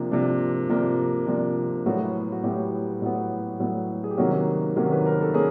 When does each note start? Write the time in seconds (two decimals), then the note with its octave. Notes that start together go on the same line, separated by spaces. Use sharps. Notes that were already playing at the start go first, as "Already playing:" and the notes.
Already playing: C3 F3 A#3 D4
0.11 C3 F3 A#3 D4
0.69 C3 F3 A#3 D4
1.27 C3 F3 A#3 D4
1.86 A2 F#3 B3 F#4
2.32 F#4
2.43 A2 F#3 B3 G4
3.02 A2 F#3 B3
3.60 A2 F#3 B3
4.04 G#4
4.11 G4
4.17 C3 D#3 F#3 A#3 C#4 F#4
4.76 C3 D#3 F#3 A#3 C#4
4.92 B4
5.06 A#4
5.21 A4
5.34 A#3 C#4 G#4